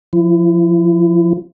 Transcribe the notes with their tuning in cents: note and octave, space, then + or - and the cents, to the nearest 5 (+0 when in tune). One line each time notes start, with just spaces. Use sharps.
F3 +0 E4 +35